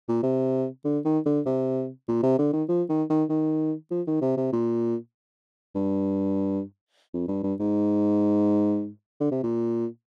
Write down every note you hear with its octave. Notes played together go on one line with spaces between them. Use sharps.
A#2
C3
D3
D#3
D3
C3
A#2
C3
D3
D#3
F3
D#3
D#3
D#3
F3
D#3
C3
C3
A#2
G2
F2
G2
G2
G#2
D3
C3
A#2